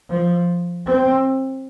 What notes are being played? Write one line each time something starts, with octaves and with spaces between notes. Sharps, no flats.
F3
C4